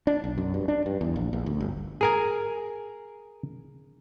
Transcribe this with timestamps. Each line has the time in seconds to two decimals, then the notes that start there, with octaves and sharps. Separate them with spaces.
0.07 D4
0.24 B1
0.38 F#2
0.54 G2
0.68 D4
0.86 G2
1.01 E2
1.16 A#1
1.33 A#1
1.46 D2
1.60 G1
2.01 G#4 A#4 G#5